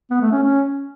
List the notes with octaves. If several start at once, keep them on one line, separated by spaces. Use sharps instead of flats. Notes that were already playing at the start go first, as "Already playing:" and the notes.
B3
A3
C#4
C#4